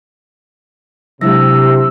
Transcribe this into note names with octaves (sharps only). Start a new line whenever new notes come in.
C3 F#3 G#3 D4 E4 E6 A#6